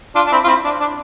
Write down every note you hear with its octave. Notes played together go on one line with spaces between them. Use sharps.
D4 F4
D4
C4 E4
F4
C4 E4
D4
D4